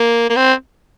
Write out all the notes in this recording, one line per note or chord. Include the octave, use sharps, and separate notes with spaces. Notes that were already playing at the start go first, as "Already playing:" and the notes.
Already playing: A#3
A#3
C4